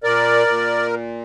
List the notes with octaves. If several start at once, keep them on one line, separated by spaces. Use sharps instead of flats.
A#2 A#4 D5
A#2